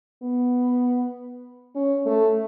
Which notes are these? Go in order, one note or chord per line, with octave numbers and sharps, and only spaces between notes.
B3
C#4
A3